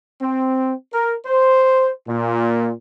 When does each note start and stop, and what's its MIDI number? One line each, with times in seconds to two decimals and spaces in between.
0.21 0.73 60
0.93 1.14 70
1.26 1.89 72
2.08 2.71 46